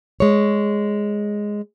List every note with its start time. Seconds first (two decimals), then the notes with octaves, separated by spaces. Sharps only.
0.20 G#3 C#5